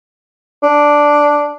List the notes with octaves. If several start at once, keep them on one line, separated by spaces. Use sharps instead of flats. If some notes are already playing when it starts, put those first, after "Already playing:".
D4